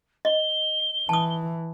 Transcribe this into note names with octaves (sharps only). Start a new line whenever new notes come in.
D#5 G7
E3 A5 D#6